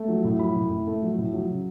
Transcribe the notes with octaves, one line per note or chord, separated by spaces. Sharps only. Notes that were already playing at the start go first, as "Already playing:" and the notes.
Already playing: A3
F#3
A2
F#3 B5
A2
A2
A3
F#3
A2
F#3
C#3